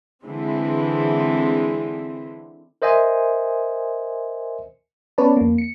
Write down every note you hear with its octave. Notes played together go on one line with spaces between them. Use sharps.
D3 E3 G#3 C4
A#4 C5 D#5 E5 G#5
B3 C#4 B4 C#5 D5 A5
F2 A#3
C#7